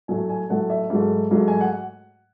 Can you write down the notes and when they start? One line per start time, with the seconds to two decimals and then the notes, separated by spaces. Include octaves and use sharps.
0.08 A2 F#3 A3 G#5
0.29 G#5
0.50 A2 F#3 A3 F#5
0.70 E5
0.90 G#2 F#3 A3
1.31 G#2 F#3 A3
1.48 G#5
1.61 F#5